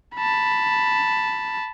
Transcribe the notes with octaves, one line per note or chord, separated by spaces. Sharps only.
A5 B5